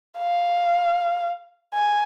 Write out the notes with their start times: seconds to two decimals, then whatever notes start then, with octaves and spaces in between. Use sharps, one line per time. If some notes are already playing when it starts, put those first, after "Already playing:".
0.19 F5
1.74 G#5